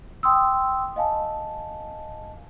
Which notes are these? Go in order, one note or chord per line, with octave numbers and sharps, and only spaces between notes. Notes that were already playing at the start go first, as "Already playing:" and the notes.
G5 C6 D#6 E6
D#5 F5 G#5 A5